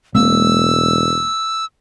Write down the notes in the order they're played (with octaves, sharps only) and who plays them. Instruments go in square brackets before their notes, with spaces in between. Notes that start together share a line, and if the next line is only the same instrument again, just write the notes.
[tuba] E1 [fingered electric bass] G#3 A#3 C4 [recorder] E6